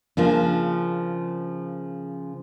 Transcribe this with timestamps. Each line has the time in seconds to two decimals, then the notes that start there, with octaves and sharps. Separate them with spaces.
0.17 C#3 F3 A#3 D4